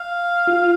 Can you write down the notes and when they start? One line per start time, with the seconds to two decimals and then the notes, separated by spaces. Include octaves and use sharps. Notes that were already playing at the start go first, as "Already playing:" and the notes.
Already playing: F5
0.47 F4